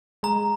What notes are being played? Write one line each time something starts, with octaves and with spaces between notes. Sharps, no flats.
G#3 A#5